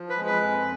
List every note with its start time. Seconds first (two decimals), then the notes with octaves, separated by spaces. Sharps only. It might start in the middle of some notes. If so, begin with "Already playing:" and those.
Already playing: F3
0.09 B4
0.17 G#3
0.26 B4
0.42 F2